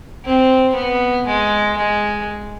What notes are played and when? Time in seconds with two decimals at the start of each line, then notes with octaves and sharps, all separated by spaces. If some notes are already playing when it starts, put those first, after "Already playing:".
0.25 C4
0.75 B3
1.26 G#3
1.77 G#3